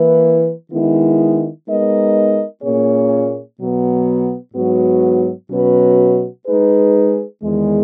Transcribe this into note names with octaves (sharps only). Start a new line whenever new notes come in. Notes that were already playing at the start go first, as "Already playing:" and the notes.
Already playing: E3 A#3 E4 B4
D#3 G#3 B3 E4
G#3 B3 D#4 A#4 D#5
A#2 A#3 C#4 G#4 C#5
B2 F#3 B3
G#2 F#3 B3 F#4
B2 F#3 C#4 F#4 B4
G#3 D#4 G#4 B4
E2 D#3 G#3